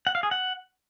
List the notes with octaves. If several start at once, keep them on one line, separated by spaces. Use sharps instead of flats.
F#5
F5
G#4
F#5